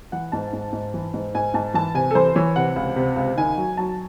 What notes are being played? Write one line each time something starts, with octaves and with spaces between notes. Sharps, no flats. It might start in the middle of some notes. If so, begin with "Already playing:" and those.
E3 F#5
G#2 A5
G#2
G#2
E3
G#2
G#2 G#5
G#2 A5
E3 A5
C3 G#5
A4
E3 C5
E3 C#5
C3 F#5
C#2
C3
C#2
D#3 G#5
F#3
F#3 A5